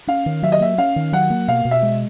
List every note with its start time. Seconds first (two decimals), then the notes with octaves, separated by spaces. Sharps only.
0.07 C#4 F5
0.26 D#3
0.42 F#3 E5
0.52 D#5
0.60 A#3 E5
0.78 C#4 F5
0.96 D#3
1.12 F#3 F#5
1.30 A#3
1.48 B2 F5
1.65 B2
1.71 E5
1.82 G#3